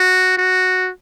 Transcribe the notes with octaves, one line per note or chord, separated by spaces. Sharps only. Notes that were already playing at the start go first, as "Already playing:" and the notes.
Already playing: F#4
F#4